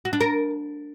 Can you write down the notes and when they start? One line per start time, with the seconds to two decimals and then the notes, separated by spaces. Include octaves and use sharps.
0.05 F#4
0.13 D4
0.21 A#4